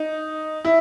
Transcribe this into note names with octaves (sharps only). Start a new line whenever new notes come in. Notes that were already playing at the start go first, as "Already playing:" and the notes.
Already playing: D#4
E4